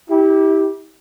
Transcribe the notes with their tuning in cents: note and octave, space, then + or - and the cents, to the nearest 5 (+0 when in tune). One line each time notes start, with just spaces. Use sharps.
E4 -35 G4 +0